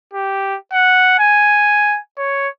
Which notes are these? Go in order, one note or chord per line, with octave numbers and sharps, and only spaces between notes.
G4
F#5
G#5
C#5